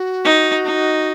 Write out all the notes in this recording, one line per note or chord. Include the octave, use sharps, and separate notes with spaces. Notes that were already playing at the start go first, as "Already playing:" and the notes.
Already playing: F#4
D#4
D#4